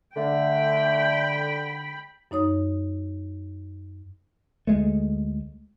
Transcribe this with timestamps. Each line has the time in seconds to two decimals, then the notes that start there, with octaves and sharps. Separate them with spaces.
0.17 D3 A3 G5 B5
2.31 F#2 D#4 C#5 D#6
4.67 D2 G#3 A3